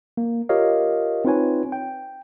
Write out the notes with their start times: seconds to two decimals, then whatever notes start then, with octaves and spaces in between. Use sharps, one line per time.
0.17 A#3
0.49 F4 G4 A#4 C#5 D#5 F5
1.25 C4 D#4 F4 B4 C#5 G#5
1.72 G5